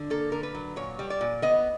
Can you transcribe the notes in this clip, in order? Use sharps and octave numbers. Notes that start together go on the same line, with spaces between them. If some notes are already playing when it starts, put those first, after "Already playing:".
Already playing: D3
A#3 A4
D3 A#4
B4
F#3
A#2 C#5
G3
D5
A#2
B3 D#5